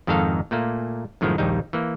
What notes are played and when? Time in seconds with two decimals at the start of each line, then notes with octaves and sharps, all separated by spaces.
0.07 F2 G#2 D#3 D#4 A4 F5
0.51 A#2 A3 A#3
1.21 F#2 A2 D#3 F3 G#3
1.38 A#1 D#2 G3 D#4
1.73 E3 A#3